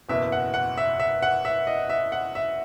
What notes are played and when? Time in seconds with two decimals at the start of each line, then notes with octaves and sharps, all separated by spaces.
0.09 F#1 E2 B2 E5
0.32 F#5
0.54 F#5
0.77 E5
1.00 E5
1.22 F#5
1.45 E5
1.67 D#5
1.90 E5
2.12 F#5
2.35 E5